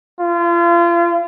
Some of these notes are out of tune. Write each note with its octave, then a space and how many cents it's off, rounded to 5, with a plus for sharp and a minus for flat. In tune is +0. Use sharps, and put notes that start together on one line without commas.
F4 -35